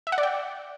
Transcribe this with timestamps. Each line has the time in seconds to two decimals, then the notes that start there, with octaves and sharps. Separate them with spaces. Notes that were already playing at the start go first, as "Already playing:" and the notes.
0.07 E5
0.12 F#5
0.18 D5
0.23 G5